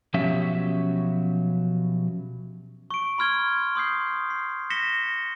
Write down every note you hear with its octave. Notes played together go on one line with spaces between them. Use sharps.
B2 F3 F#3 C#4 G4 E5
C#6 D7
B5 C6 F6 G#6 G7
C6 D#6 G6 C7
C7
A#6 B6 C#7 E7 G7